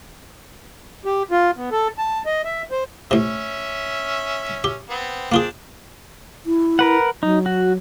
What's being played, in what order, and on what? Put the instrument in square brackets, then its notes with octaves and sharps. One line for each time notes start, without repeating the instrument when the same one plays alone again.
[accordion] G4
F4
B3
A4
A5
D#5
E5
C5
[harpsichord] A2 C3 [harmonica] C#4 E5
[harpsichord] G4
[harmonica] B3 C4
[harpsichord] A#3 F4 G#4 [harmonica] C4 D4
[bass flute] E4
[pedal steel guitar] A#4 B4 F#5
[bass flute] F#3 [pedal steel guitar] D#4
[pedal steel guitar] F#4